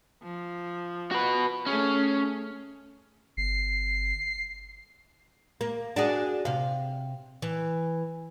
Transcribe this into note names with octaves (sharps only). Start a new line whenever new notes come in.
F3
F#4 B4
A3 C#4 G#4
G1 C7
A#3
D4 F#4 G#4
C3 F5
E3